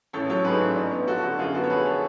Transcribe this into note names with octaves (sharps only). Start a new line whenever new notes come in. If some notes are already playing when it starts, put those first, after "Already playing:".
A1 A4 C#5
F#3 A4 C#5
G#2 G#4 B4
A1
D4
B3
F3 F#4 A4
D3 F#4
F#2 F4 G#4
B3 F#4 A4
C#5
F3 G#4 B4
A4 C#5